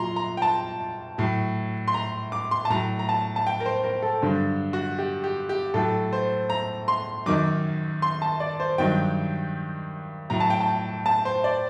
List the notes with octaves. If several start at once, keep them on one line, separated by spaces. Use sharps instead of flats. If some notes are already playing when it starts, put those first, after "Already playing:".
Already playing: A#2 F#3 A#5 C6
A#5
G5
A5
A2 F#3
C6
A#5
D6
C6
A5
A2 F#3 A#5
A#5
A5
A5
G5
A#4
C5
A#4
A4
G2 D3 F#3
F#4
G4
G4
G4
A2 F#3 A4
C5
A#5
C6
F#2 D#3 F#3 D6
C6
A5
D5
C5
G2 D#3 F#3 G5
A2 F#3 A#5
A5
G5
A5
A5
C5
D5